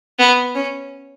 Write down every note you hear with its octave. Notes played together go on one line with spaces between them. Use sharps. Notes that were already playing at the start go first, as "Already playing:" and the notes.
B3
C#4